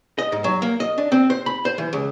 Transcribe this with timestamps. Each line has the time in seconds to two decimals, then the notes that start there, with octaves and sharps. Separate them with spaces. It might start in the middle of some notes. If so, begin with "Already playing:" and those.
0.18 D#5
0.32 G#2
0.44 F#3
0.62 A#3
0.80 D#5
0.98 D4
1.12 C4
1.30 C5
1.46 B5
1.65 C5
1.78 E3
1.93 C#2